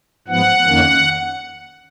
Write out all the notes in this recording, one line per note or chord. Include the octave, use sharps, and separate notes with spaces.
G#2 F3 B3 F#5
F2 D#3 A#3 C#4